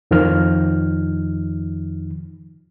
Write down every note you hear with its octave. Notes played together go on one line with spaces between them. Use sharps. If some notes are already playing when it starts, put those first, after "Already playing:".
F2 D#3 F3 D#4 F6